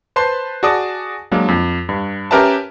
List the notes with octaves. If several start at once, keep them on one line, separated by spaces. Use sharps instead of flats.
B4 C5 A5 C6
F#4 G#4 D5 A5 D#6
F#3 G#3 A#3 D4
F2
G2
C#4 G4 A#4 B4 E5 A5